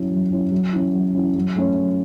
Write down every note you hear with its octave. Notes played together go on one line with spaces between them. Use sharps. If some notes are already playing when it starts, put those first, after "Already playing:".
Already playing: F#3 C#4 E4
F#3
C#4 E4
F#3
C#4 E4
F#3
C#4 E4
F#3
A3 C#4
F#3